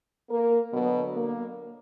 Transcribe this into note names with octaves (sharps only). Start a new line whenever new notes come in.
A#3 A#4
B2 D3 F#3 B3
A#3